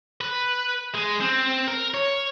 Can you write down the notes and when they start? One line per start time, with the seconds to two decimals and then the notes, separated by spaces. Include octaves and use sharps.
0.21 B4
0.94 G#3
1.21 C4
1.68 A#4
1.94 C#5